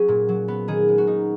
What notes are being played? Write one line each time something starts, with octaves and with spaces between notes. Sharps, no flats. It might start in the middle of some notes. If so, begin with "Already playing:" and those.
Already playing: F#3 C#4 F#4 G#4
A#2
F#3
B3
D#3 G#4
G#3
F#4
D#4